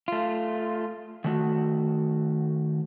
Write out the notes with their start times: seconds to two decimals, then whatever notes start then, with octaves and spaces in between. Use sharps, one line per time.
0.08 A3 F4
1.24 D#3 A3 F#4